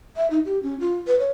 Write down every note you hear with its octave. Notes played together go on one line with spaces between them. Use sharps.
E5
D#4
G4
C#4
F4
B4
C#5